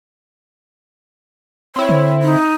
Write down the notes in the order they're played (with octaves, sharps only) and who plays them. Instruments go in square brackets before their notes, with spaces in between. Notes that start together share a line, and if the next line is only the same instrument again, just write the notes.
[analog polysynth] C4 E4 [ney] C#5
[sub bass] D3
[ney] D#4